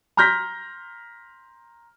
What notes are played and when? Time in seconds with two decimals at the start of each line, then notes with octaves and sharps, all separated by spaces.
0.17 A#5 C6 F6 G6 A#6 B6